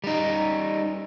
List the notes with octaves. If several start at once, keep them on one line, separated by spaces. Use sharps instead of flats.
G3 D#4